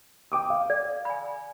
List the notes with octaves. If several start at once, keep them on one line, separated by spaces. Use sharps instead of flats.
G5 D6 D#6
F5
D5
G#5 B5